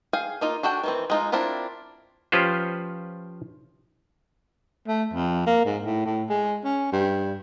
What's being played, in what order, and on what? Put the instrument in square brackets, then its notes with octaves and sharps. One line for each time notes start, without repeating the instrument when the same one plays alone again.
[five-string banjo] G#4 F5 G5
A#3 D#4 F4
D4 F#4 A4 G5
D#3 E3 C4
G#3 D#4 F4
C4 D4 E4 F4 A#4
[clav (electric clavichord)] F3 C#4 F4 G4 B4 C5
[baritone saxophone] A3
F2
A#3
G#2
A2
A2
G#3
C#4
G2